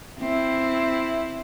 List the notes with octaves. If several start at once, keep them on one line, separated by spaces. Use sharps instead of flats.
C4 E4